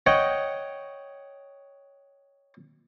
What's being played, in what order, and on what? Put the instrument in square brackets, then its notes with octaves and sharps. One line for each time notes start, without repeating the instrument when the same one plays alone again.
[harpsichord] C#5 D#5 F#5 G5